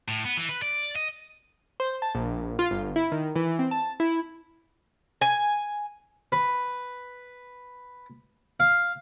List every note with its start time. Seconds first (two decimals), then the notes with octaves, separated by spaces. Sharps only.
0.08 A2
0.25 B3
0.37 E3
0.49 B4
0.62 D5
0.96 D#5
1.80 C5
2.02 A5
2.15 A#1
2.59 F4
2.71 G1
2.96 E4
3.12 D#3
3.36 E3
3.59 C4
3.71 A5
4.00 E4
5.21 G#5
6.32 B4
8.60 F5